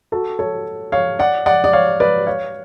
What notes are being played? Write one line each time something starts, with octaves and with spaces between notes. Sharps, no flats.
F#4 A4
A4 C#5
C#5 F5
D5 F#5
D5 F#5
D5
C#5 F5
B4 D5
C#5 F5